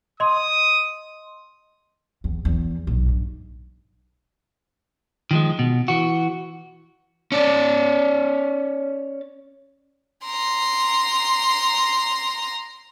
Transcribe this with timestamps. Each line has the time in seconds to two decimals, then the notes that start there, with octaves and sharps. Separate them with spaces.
0.20 D#5 C6 D#6
2.24 E2
2.45 E2
2.87 B1
3.08 G2
5.31 D#3 F3 G#3
5.59 B2
5.88 E3 F#4
7.32 C#4 D5
10.26 A#5 C6